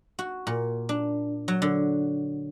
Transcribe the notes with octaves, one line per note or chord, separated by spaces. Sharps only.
F#4
A#2
D4
F#3
D3